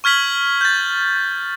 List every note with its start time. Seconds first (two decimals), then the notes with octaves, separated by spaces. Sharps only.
0.04 C#6 F6 G#6 B6 F#7
0.61 G6 A6